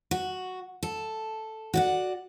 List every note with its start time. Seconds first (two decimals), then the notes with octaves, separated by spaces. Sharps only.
0.11 F#4
0.83 A4
1.74 F#4 D5 F#5